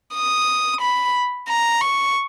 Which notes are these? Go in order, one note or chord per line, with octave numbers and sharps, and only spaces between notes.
D#6
B5
A#5
C#6